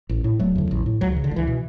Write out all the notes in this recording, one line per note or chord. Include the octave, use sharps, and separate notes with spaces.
A1
A2
E1 F#3 A3
E2 D3
A1
A2
C#2 F#3
C#3 E3
D3
C#2
E3
B2